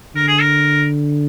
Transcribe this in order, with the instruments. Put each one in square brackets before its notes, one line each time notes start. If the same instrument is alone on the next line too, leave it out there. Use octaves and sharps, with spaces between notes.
[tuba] D3 [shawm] A#4
[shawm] G#4
A#4